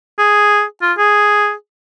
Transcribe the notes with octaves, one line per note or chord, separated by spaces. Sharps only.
G#4
F4
G#4